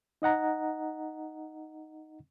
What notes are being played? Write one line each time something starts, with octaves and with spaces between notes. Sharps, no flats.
D#4 D#5 F#5 A#5